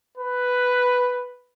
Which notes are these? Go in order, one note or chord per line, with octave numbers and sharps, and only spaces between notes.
B4